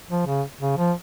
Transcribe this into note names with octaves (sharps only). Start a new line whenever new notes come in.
F3
C#3
C#3
F3